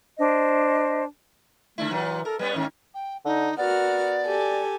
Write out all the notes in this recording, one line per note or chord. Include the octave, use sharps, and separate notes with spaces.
D4 C5 D#5
D3 A3 D4 E4
A#2 E3 F#3
A4 A#4
G3 B3 C#4 B4
G#2 D#3 A#3 C#4
G5
D3 D#4
B3 F#4 A#4 D5 F6
G4 A4 G#5